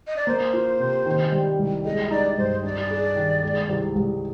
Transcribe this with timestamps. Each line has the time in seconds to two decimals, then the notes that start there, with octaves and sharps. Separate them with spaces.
0.07 D#5
0.16 D5
0.27 A#3 C5
0.54 F4
0.80 C3
1.06 D#3
1.32 G3
1.59 C2
1.85 G#3 D#5
2.11 D#4 D5
2.37 G2 C5
2.64 D4 D5
2.91 G#4
3.16 D#3
3.43 G#3
3.69 C2
3.96 C2